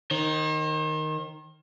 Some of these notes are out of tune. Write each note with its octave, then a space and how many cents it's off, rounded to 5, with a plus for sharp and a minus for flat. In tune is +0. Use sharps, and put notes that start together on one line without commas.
D#3 +0 C5 +45